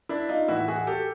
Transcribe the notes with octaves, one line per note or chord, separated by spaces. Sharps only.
D4 E4
D#4 F4
A2 E3 E4 F#4
F#4 G#4
G4 A4